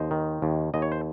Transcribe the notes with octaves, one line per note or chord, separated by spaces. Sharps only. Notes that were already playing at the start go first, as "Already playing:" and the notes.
Already playing: D#2 C5 D#5
D#3
D#2
D#2 D#5
C#5
C5